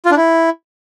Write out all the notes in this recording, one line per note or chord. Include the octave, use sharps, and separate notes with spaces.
F4
D4
E4